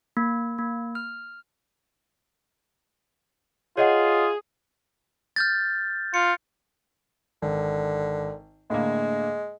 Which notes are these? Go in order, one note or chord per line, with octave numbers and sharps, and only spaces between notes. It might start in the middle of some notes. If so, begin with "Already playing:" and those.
A#3
A#3
F6
F4 G#4 C#5 D#5 F#5
F6 G6 A6
F4 C#7
G#1 D3
A2 D3 G#3 A#3